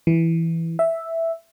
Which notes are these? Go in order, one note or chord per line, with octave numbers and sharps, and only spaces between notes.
E3
E5